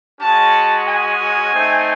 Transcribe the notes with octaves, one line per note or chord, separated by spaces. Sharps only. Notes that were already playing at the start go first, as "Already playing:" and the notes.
G#3 C#4 F#4 A5
G#5
A3 C4 D#4